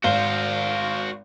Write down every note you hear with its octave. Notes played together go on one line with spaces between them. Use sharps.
G#1 F#4 C5 F5 G7